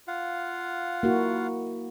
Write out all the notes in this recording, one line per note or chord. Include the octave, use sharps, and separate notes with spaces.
F4 F5 F#5
A#3 E4 F#4